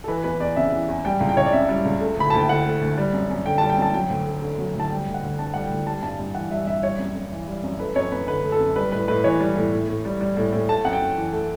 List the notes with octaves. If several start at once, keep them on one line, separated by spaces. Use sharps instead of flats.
A4
E3 B4
E2 B4
E2 D5
C#3 E5
E3
E2
G3 G5
C#2
G5
C#2 C#5
D5
C#3 E5
G3
C#2
A3
D2 B5
D2 A5
G5
D3 F#5
A3
D2
G3
F#2
F#2
D3 G5
G3 A5
G5
F#2 A5
F#3 G5
D2
A3
D3
F#3
D2
A5
G3 G5
D2
F#5
D2
D3 A5
G3 F#5
G5
D2
G3 A5
G2 A5
G2
E3 F#5
G3 E5
G2 E5
G3 C#5
F#2
F#2
E3
G3
F#2
A3 B4
F#2 C#5
F#2 B4
D3 B4
A3
A4
F#2
G3 B4
A2 B4
A2 B4
E3 C#5
G3
A2
A2
A2
G3
G3
A2
A2
A3 A5
F#2 F#5
G5
F#2
E3
A3